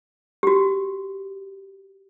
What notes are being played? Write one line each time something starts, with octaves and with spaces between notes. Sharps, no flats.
G4
F#4